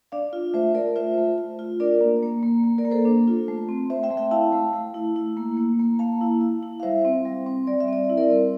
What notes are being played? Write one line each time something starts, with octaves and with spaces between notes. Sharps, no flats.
D4 D5 F5
F4
A3 C5 E5
A3 A#4 D5
F4 C5 E5
A3
F4
F4
D4 A#4 D5
A#3
A#3
A#3
A#3
A#4 D5
A#3
A4 C5
D4
F4
A3
C4
C4 C5 E5
E5 G5
A3
E5 G5
E4 F5 A5
A3
A3
E4
E4
A#3
A#3
A#3
A#3 F5 A5
E4
E4
E4
F5
G3 C5 E5
C4
G3
C4
G3 D5
E5
C4 D5
E4 E5
A#4 D5
C4